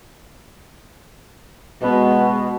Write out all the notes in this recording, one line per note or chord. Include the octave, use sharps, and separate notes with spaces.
B2 G#3 B3